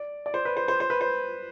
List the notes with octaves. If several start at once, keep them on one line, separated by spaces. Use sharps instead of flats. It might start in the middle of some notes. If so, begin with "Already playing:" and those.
Already playing: D5
D5
C5
B4
C5
C5
C5
B4
C5